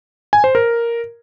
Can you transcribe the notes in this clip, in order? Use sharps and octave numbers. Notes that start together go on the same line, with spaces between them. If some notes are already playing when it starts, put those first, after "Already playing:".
G#5
C5
A#4